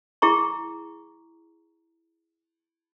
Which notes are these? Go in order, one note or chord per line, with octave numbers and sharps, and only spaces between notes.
E4 G#4 A#5 C#6